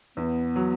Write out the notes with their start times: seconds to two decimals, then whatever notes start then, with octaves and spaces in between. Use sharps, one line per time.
0.17 E2 B3
0.56 F#3